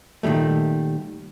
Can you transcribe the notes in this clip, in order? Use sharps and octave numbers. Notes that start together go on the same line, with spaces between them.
A#2 D#3 E3 G3 A3